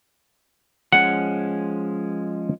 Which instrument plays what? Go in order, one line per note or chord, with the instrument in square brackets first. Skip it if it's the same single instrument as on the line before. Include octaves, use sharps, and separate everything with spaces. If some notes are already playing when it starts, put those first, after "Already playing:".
[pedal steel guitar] F3 G#3 C#4 [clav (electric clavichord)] F#5